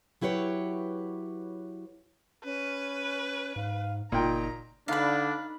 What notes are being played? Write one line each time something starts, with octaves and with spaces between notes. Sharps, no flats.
F#3 E4 G4 B4 C#5
C#4 B4
G#2 F5
F#1 A#2 D#4 G5 A#5
D3 D4 D#4 B4 F5 B5